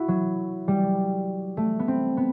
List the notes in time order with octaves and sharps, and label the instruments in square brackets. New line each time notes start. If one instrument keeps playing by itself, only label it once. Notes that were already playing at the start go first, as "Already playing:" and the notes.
Already playing: [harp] E4 F#4
F#3
G3
A3
B3
C4
B3